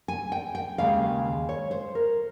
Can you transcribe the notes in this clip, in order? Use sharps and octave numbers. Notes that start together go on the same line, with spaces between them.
G#5
G5
G5
D#2 C#3 G#3 F5
C#5
C5
A#4